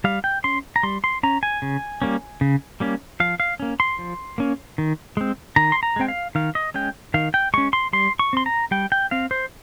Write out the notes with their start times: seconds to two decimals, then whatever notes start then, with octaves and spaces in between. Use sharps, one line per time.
0.04 G3 F5
0.24 G5
0.44 C#4 C6
0.76 A#5
0.83 G3 C6
1.04 C6
1.23 C#4 A#5
1.43 G#5
1.62 C#3
2.02 G3 A#3 C#4
2.41 C#3
2.80 G3 A#3 C#4
3.20 F3 F5
3.40 F5
3.60 A#3 C#4
3.80 C6
3.99 F3
4.38 A#3 C#4
4.78 D#3
5.17 G#3 C4
5.56 D#3 A#5
5.72 C6
5.83 A#5
5.96 G#3 C4 G5
6.08 F5
6.35 D#3 F5
6.55 D#5
6.74 G#3 C#4 G5
7.14 D#3 F5
7.34 G5
7.54 G#3 C#4 C#6
7.73 C6
7.93 G3 C6
8.19 C#6
8.33 C4 C6
8.46 A#5
8.71 G3 G5
8.92 G5
9.11 C4 F5
9.31 C5